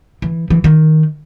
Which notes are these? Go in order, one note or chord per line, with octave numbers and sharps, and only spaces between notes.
E3
E3
D#3